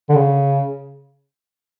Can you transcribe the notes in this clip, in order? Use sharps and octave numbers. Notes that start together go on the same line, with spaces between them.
D3
C#3